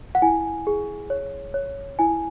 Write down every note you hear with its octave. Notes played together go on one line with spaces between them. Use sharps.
F#5
E4 G#5
G#4
C#5
C#5
E4 G#5